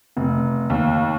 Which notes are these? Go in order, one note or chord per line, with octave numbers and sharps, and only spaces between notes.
F1
D#2